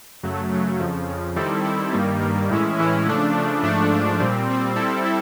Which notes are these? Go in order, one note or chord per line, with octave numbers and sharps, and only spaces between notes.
F#2 C#3 F#3 A3
F#2 C#3 F#3 A3
F2 C#3 F3
F2 C#3 F3
D#3 G3 C4 E4 A4
D#3 G3 C4 E4 A4
G2 D#3 G3 A#3
G2 D#3 G3 A#3
A2 E3 G#3 C#4 E4
A2 E3 G#3 C#4 E4
C#3 F3 A3 D4
C#3 F3 A3 D4
G#2 F3 A3 D4
G#2 F3 A3 D4
A#2 G3 C4
A#2 G3 C4
G3 C4 E4 A4
C4 E4 A4